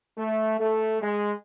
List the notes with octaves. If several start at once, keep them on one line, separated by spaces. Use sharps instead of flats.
A3
A3
G#3